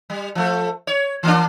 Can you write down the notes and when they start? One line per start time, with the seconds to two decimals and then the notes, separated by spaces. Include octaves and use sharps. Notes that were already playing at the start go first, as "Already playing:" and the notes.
0.10 G3
0.35 F3 A3
0.87 C#5
1.23 E3 A#3 D4